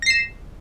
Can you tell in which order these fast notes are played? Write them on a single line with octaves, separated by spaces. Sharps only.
A#6 C7 E7